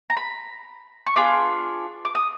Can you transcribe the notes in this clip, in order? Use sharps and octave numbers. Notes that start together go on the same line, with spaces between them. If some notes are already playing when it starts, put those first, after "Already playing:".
A#5
B5
C#6
B3 D4 F4 G#4 D6
D6
D#6